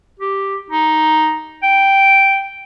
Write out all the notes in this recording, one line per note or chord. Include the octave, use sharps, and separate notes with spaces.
G4
D#4
G5